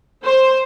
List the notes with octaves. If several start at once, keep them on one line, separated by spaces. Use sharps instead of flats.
C5